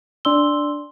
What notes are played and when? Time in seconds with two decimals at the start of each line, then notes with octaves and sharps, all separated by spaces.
0.25 D4 D5 C6 E6 G7